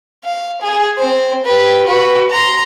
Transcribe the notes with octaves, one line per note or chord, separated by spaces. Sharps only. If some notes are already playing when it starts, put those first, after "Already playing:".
F5
G#4
C4 C5
G4 B4
F#4 B4
A#5 C6